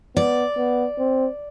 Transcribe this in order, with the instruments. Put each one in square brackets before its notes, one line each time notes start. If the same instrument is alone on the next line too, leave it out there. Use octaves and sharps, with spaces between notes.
[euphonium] B3 [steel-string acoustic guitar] D5
[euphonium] B3
C4